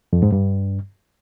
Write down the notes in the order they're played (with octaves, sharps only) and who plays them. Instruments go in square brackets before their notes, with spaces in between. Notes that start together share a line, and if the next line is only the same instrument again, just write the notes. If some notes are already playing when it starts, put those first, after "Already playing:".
[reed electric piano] F2
G#2
G2